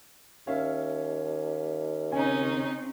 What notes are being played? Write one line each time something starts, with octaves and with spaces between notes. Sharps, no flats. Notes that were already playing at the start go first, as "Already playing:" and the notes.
D#2 C#4 E5 F5
C#3 C4 C#4 D#4 G#5